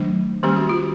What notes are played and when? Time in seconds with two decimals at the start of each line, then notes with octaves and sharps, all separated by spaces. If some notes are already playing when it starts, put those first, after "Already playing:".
Already playing: D#3 F#3 A3 D4
0.43 D#3 G3 A#3 C#4 G4
0.56 F#4
0.69 F4